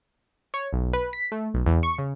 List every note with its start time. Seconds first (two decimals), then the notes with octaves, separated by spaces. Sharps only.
0.54 C#5
0.73 B1
0.93 B4
1.13 B6
1.32 A3
1.54 B1
1.66 E2
1.83 C#6
1.98 C#3